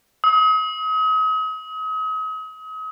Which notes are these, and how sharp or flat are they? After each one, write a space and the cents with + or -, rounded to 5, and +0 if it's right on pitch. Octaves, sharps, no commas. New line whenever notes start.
D#6 +40